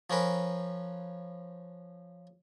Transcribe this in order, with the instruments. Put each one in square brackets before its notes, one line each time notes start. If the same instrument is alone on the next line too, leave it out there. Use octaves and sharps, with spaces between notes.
[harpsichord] F3 C#4 A#4 B4